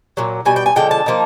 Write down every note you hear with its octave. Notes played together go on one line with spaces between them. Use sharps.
A#2 F#3
B2 G3 G#5
G5
G#5
D3 F3 G#3 G5
A5
F3 A#3 D#4